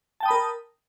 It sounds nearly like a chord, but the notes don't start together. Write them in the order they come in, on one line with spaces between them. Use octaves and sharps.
A5 G5 D#6 B5 A#4